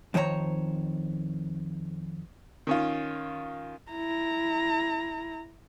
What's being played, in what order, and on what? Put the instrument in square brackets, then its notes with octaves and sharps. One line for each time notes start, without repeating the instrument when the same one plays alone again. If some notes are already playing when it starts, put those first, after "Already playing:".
[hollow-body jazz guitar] F2 D#3 C5 C#5 A#5
[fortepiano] D#3 C#4 F4
[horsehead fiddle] E4 A#5